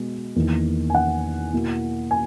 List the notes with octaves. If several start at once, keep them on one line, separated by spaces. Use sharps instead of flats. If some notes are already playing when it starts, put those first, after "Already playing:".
Already playing: B2 G#3 B3
E2 D#3 A#3
G#5
F#5
B2 A#3 E4
G#5